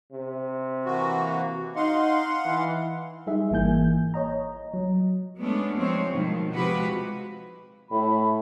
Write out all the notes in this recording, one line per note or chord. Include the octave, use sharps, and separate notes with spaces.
C3
E3 A#3 F#4
D#4 F5 F#5 C6
E3
G3 D#4 G#4 E5
G#1 E3 A#3 G#5 G6
C#5 D#5 A#5
F#3
G#3 A3 B3 C#4 D4 A4
F3 G#3 C4 C5 C#5
B2 D#3 F3
C3 F3 G#3 F#4 G4 B4
A2 B5